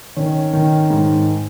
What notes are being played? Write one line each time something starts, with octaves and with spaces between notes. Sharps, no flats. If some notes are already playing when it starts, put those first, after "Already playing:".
D#3 C#4
D#3
G#2